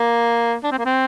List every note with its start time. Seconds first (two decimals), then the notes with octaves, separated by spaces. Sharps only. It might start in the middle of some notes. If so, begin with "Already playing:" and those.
Already playing: A#3
0.64 D4
0.72 C4
0.78 A#3
0.86 C4